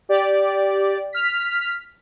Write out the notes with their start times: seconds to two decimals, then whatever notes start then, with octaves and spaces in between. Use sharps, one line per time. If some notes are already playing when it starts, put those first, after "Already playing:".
0.09 G4 D5
1.13 F6 B6